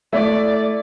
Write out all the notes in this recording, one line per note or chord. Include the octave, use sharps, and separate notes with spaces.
A3 E4 D5